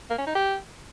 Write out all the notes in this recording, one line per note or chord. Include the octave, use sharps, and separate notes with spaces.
A#3
C#4
D#4
G4